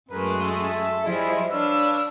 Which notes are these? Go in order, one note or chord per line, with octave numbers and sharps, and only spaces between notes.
F#2 G#3 A3 A#4 B4
A4 E5
F3 G3 E4 G#4 D#5
D4 B4 C#5 F5 E6